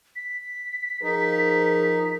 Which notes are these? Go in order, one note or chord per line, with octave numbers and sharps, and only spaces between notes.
B6
F3 D#4 G#4 A#4